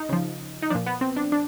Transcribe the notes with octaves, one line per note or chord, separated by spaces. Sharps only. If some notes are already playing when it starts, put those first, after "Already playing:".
Already playing: D#4
C#3 F3
D#4
A#2 F3 D4
B3
C4
D4
D4